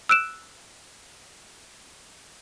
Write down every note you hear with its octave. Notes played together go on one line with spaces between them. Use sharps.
E6 F#6 D7 E7